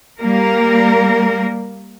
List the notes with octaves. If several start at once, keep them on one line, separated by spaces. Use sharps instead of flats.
G3 A#3 A#4